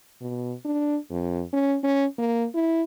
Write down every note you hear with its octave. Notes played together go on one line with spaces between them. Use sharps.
B2
D4
F2
C#4
C#4
A#3
E4